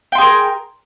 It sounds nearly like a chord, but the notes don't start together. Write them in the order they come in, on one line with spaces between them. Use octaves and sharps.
G5 C6 G#4 A#4